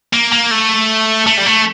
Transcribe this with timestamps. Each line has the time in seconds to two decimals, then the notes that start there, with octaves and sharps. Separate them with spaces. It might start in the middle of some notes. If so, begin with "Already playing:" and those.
0.13 A#3
0.32 A#3
0.51 A3
1.27 A3
1.37 G3
1.46 A3